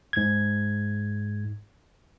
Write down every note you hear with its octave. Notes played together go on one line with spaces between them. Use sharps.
G#2 G#6